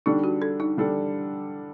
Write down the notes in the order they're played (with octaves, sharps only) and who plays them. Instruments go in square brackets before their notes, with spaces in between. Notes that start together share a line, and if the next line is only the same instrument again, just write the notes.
[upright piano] D3 G3 D4 A4 [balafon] D#4
[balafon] F#4
A4
D#4
[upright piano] D3 G3 D4 A4